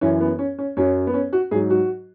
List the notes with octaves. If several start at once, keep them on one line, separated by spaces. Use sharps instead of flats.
F#2 E3 C#4
B3
C#4
C#4
F#2 F#3 C#4
B3
C#4
F#4
G#2 F#3 G#4
F#4